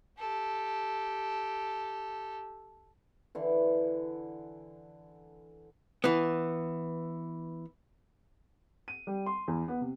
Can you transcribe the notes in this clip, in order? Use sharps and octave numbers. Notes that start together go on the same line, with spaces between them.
G4 A4
D3 E3
E3 B3
D#7
G3
C6
E2
B3
C3